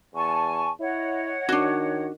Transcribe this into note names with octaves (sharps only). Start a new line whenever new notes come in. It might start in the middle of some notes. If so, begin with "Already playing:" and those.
E2 G#5 A5 C#6
E4 C#5 D#5 F#5
D#3 D4 F#4